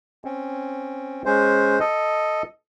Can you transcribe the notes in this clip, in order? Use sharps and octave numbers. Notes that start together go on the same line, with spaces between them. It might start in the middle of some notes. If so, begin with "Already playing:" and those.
C4 C#4
G#3 C#4 C5
A4 D#5